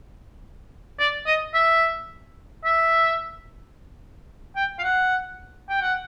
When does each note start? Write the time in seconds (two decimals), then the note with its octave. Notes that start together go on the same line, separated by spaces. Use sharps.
0.99 D5
1.26 D#5
1.54 E5
2.64 E5
4.56 G5
4.78 F5
4.83 F#5
5.69 G5
5.81 F#5